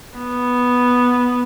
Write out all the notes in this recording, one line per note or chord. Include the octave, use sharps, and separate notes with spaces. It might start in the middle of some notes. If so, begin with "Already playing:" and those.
B3